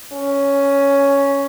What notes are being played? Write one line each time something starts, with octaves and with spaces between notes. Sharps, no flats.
C#4